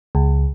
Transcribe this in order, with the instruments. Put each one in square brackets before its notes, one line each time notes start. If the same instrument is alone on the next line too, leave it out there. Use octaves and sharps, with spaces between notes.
[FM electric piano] C#2